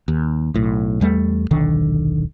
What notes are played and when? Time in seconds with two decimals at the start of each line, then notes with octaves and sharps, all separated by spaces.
0.08 D#2
0.54 B1 A2
1.01 E2 G3 A3
1.51 D#1 B1 D3 D#3